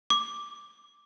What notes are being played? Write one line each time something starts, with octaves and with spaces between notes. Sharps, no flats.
D6